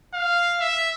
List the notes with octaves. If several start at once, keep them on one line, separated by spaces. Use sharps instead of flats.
F5
E5